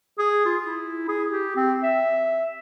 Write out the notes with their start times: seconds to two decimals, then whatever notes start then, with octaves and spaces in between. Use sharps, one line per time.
0.18 G#4
0.45 F4
0.62 E4
1.08 G#4
1.30 G4
1.56 C4
1.83 E5